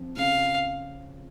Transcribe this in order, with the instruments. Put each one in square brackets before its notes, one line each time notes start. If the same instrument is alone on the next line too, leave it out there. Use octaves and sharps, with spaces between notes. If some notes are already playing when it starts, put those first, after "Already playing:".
Already playing: [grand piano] F3 C4
[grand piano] C#3 [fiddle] F5